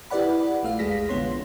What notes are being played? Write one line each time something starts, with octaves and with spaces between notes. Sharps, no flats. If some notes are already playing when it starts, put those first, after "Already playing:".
E4 G4 B4 D5 F#5 B5
A#1 A3 F5
B1 E2 G#3 G#4 A#6 B6
A#1 D3 E3 B3 C#5 C6